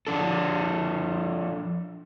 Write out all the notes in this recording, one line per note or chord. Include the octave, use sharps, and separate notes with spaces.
F3 D4 A4